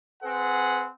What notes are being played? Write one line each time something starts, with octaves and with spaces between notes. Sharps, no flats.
C4 G#4 B4 F#5